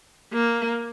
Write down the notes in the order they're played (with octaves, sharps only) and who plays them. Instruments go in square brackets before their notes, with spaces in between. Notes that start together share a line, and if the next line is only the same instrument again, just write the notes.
[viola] A#3